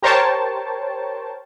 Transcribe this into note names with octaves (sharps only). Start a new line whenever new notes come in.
G4 A#4 C5 C#5 G5 A5